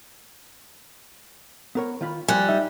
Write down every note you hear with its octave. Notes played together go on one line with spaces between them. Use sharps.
B3 A#4 C#5
D#3 F4 B5
F3 G3 G#5 F#6
D#4 E5